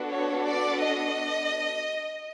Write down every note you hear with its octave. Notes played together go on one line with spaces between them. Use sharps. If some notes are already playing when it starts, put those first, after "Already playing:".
Already playing: B3 D4 F#4 A4
C#5
D5
D#5